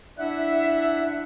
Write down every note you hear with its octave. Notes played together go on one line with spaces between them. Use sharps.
D4 E4 E5 F#5